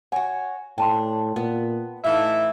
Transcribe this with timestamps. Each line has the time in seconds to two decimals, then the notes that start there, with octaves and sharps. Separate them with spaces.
0.12 F#4 C#5 F#5 G#5
0.78 A2 D4 G5 A5 C6
1.36 A#2 B3
2.04 A2 E3 A3 D#4 E5 F5